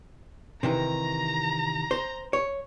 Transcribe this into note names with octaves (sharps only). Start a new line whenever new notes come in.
C3 D#3 E3 A#5
C5
C#5